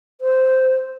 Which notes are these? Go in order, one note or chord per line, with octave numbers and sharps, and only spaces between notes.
C5